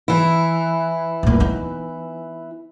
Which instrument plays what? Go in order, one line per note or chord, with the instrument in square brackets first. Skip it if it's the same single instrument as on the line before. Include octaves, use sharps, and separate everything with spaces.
[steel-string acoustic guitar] E3 E4
[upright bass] D1 A#2
B3 D#4